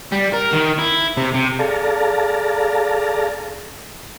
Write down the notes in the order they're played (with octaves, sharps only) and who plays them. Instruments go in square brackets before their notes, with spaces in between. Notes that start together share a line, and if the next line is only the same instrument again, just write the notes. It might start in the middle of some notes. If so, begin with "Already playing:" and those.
[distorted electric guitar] G3
A#4
D#3
E4
C3
C3
[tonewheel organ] G#4 A4 D5 F5 A5 A#5